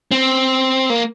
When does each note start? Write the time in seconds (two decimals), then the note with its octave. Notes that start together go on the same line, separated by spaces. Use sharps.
0.11 C4
0.90 A#3